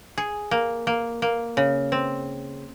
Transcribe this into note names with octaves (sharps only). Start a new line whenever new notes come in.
G#4
A#3
A#3
A#3
C#3
C4